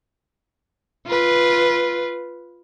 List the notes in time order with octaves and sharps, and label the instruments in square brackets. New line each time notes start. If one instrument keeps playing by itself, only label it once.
[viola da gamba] F4 B4